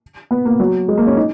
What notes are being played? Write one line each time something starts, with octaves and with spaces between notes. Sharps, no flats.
B3
A#3
F#3
G#3
A#3
C#4
D#4